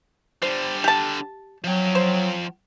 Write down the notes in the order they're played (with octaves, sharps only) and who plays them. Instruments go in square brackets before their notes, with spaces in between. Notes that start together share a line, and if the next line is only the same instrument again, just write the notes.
[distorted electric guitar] D3 G3 [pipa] C5
[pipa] G4 A5
[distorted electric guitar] F3 G5 [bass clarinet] F#3
[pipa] C5